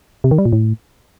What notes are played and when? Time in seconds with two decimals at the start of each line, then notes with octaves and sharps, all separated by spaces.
0.24 C3
0.31 D#3
0.38 G3
0.45 A#2
0.53 A2